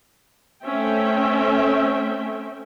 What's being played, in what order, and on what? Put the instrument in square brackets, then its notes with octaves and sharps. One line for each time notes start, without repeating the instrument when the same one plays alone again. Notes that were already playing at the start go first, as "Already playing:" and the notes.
[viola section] A3 C4 C#4 E5 G5